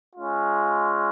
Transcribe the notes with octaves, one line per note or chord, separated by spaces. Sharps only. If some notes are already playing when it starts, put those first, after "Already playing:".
G#3 C#4 F4